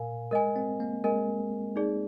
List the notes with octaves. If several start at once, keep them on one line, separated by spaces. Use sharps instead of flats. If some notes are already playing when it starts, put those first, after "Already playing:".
Already playing: A#2 A#4 F5 G#5
G#3 A#4 D#5 G#5
C4
A#3
G#3 A#4 D#5 G#5
D#4 G#4 D5